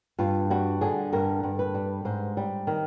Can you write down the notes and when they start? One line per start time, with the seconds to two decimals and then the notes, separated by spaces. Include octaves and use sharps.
0.19 G2 F4
0.50 G3 F#4
0.81 D3 G#4
1.13 G2 A#4
1.43 G2
1.59 B4
1.74 G3
2.05 G#2 C5
2.37 G3
2.67 D#3